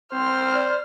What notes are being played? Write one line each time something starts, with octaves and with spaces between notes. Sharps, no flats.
C4 C5 F6
D5